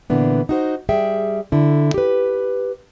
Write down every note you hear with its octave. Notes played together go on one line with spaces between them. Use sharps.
A#2 D3 E3 B3 D4
D#4 F#4 C5
G3 G#4 E5 G5
D3 E4
G4 B4